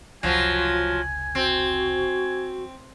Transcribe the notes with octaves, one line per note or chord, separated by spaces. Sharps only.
F1 C#2 F3 F#3 F4 G#5
C4 F#4